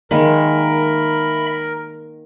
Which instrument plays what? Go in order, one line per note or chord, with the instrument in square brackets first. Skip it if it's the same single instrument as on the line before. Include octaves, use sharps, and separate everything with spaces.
[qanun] D#3 G#3 [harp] A#3 [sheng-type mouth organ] A#4 [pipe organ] E5 B5